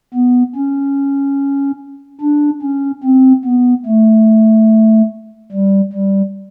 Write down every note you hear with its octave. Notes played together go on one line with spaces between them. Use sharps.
B3
C#4
D4
C#4
C4
B3
A3
G3
G3